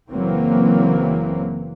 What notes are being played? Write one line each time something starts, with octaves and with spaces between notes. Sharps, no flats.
F#1 E3 F#3 A#3 C4